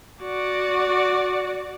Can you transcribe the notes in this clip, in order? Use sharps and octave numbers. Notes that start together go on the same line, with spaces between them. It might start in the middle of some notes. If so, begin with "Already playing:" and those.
F#4 D5